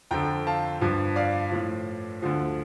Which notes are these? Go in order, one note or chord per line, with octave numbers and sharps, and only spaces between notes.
F2 D3 F3 G5 A#5
F5 A5
G2 F3
D5 F5
A2 F3
D2 D3 F3